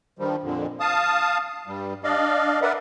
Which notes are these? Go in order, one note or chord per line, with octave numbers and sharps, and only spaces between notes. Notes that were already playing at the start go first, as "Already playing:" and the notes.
G2 D#3 F3 G3
F2 A#2 D3
F5 A5 D#6
G2 G3
D4 D5 D#5 F5
A#4 B4 D5 E5 F#5